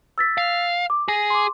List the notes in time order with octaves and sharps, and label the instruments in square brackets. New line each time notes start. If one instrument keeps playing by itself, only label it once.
[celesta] E6 A6 B6
[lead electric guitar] F5
[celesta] D6
[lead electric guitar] G#4 [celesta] A#6
[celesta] C6 D6